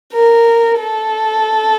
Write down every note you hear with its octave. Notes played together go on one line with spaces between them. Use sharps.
A#4
A4